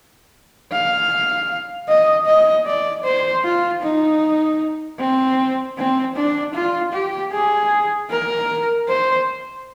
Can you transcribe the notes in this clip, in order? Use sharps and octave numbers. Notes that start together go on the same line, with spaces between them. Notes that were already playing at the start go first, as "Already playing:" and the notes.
F5
D#5
D#5
D5
C5
F4
D#4
C4
C4
D4
F4
G4
G#4
A#4
C5